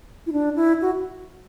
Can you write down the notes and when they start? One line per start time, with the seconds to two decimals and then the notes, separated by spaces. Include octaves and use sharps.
0.27 E4
0.32 D4
0.56 E4
0.82 F#4